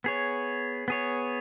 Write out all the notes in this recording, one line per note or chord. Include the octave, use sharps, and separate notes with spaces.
B3 G#4 C#5
B3 G#4 C#5